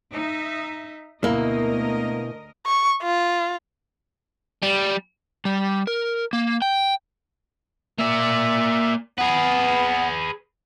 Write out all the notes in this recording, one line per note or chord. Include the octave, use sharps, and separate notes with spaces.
D#4 E5
D2 B2 A#3 E4 A#4 D#5
C#6
F4
G3
G3
A#4
A#3
G5
A#3 D5 E5
B3 G#4 B4